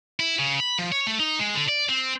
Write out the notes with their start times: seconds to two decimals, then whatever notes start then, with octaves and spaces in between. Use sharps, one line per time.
0.20 E4
0.38 C#3
0.60 B5
0.79 F3
0.92 C#5
1.07 A3
1.20 D#4
1.39 G#3
1.54 D3
1.68 D5
1.89 C4